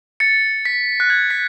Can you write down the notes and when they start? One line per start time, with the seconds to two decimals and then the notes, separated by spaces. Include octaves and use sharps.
0.20 A6 C#7
0.65 B6
1.00 F#6
1.10 G#6
1.30 B6